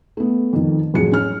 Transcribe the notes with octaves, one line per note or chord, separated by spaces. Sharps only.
A3 B3
F2 D#3
A1 F2 F#3 G#4 C#7
C#4 F6